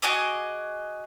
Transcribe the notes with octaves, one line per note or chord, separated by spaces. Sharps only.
F#4 G#4 D#5 D6